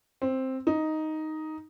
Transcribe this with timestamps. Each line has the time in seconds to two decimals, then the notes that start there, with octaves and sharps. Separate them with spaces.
0.22 C4
0.67 D#4